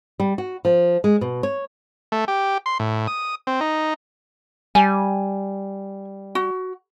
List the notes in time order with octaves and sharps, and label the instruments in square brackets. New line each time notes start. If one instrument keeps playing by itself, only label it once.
[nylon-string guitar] G3
F#4
F3
G#3
B2
C#5
[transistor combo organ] A3
G4
C6
A2
D#6
C4
D#4
[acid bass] G3 [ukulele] G#5
[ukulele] F#4